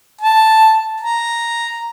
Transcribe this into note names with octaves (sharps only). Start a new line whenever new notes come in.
A5
A#5